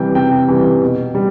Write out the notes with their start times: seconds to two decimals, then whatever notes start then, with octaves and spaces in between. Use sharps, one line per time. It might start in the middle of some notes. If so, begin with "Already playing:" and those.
Already playing: C3 E3 G3 G5
0.15 C3 G5
0.48 E3 G3
0.82 B2
1.15 G3